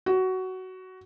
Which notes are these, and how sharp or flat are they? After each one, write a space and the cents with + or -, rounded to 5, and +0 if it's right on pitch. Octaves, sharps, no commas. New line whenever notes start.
F#4 +15